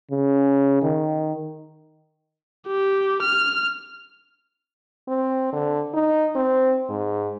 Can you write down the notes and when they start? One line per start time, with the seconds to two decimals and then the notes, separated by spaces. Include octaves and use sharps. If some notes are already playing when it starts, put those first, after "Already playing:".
0.11 C#3
0.82 D#3
2.67 G4
3.22 F6
5.08 C4
5.53 D3
5.94 D#4
6.36 C4
6.89 G#2